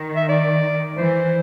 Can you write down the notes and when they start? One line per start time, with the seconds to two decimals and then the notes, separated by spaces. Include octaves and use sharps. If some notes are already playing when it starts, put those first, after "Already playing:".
Already playing: D#3
0.16 E5
0.28 D5
0.97 E3 C5